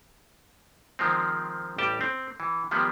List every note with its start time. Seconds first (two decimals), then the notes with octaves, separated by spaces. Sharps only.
0.99 D#3 F3 G#3 C4
1.78 A1 G3 G4 G5 A5
2.01 C4
2.40 E3
2.71 D#3 F3 G3 G#3 B3